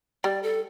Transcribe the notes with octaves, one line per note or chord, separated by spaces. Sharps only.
G3 D5
A4